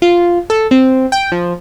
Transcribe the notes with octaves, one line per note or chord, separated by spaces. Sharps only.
F4
A4
C4
G5
F3